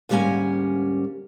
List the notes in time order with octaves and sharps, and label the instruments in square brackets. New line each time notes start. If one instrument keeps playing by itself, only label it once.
[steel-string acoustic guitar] D2 G#2 G3 A#3 C#4 G#5